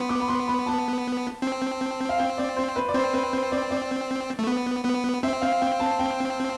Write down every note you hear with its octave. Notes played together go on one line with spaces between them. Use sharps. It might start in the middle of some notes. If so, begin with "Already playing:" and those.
Already playing: B3 C6
D6
B5
C6
B5
A5
C4
F5
G5
D5
C5
B4
D5
C4 C5
B4
C5
D5
D5
A3
B3
B3
C4 E5
F5
G5
A5
G5